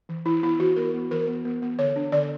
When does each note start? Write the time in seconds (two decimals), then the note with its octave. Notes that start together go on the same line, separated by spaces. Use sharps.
0.09 E3
0.25 E3 E4
0.42 B3 E4
0.59 E3 F#4
0.76 B3 A#4
0.94 B3
1.11 E3 A#4
1.27 B3
1.45 B3
1.62 B3
1.79 D3 C#5
1.96 D4
2.12 D3 D5